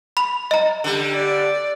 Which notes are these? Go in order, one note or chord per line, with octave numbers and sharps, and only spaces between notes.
B5 F7
D#5 A#5
D3 G3
D5